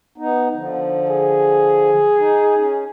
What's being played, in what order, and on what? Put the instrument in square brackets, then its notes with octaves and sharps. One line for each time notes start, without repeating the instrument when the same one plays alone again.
[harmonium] B3 D#4
D3 F3
[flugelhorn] G#4
[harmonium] D#4
C#4